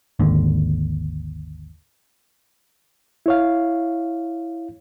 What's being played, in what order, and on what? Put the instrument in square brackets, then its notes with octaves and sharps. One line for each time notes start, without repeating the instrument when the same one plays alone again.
[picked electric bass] G#1 D#2 D3
[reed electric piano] E4 C#5 F5